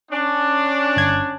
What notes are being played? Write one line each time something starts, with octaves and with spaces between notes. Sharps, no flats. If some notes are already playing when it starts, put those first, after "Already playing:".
C#4 D4
G1 G#6